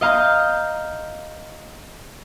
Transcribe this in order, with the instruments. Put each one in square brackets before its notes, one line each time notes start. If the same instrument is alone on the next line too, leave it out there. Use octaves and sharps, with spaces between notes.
[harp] D#5 F5 A#5 G6